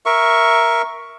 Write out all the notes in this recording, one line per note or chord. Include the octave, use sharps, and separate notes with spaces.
A#4 E5 C#6